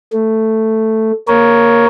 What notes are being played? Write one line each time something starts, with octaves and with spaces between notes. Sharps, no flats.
A3
A#3 A#4 C#5